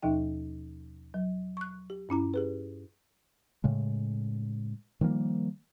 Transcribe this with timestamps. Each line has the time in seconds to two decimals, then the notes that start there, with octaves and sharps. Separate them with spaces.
0.02 D#2 B2 F3 D#4 G5
1.14 F#3
1.57 C#6 F#6
1.90 G4
2.09 G2 C#4 E4 A#5
2.34 G4 G#4 B4
3.64 A2 C#3 G#3
5.01 D#3 F3 G3 A#3